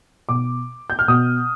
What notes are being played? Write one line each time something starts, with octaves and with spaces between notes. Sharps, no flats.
B2 D6
G6
F6
B2 D#6